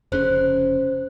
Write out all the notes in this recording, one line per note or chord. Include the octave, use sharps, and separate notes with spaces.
F1 C#3 C#4 C5 F#6